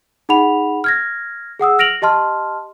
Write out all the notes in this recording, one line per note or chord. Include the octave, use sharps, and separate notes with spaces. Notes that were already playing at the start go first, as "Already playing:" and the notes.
D#4 G#4 F#5 B5 F7
F6 G#6 A#6
G#4 F#5 D#6 E6
F6 A#6 D7 F7 F#7
G4 D#5 A5 C6 F6